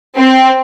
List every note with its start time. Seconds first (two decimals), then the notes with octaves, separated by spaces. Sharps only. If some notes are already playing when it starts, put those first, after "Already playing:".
0.17 C4